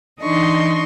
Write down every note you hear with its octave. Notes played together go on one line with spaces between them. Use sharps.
E3 D4 D#4 D#5 C6 C#6